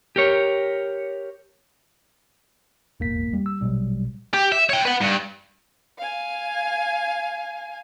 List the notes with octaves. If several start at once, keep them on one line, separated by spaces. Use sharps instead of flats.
G4 A#4 C#5
D#1 G#1 E2 A#3 B6
G3
E6
A#1 B2 F#3 G3
G4
E5
C#5 G5
B4 F#5
G2
F5 G#5